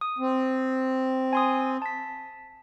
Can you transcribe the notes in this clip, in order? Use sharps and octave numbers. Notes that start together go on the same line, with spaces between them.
D#6
C4
G#5 C6 D#6
A5 B6